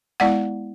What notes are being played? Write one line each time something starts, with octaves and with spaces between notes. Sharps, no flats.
G#3 B3 E4 D5 F#5